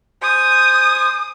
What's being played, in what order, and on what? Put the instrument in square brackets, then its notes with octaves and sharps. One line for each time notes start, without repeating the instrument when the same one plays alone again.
[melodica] C5 G#5 [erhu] D#6